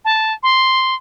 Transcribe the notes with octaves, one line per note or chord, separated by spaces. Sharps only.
A5
C6